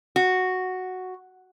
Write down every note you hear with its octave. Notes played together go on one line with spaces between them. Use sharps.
F#4